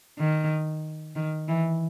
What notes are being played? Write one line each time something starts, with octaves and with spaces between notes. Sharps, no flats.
D#3
D#3
E3